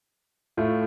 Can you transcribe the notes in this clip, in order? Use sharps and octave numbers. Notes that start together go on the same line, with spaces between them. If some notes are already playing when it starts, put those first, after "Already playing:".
A2 A3 F4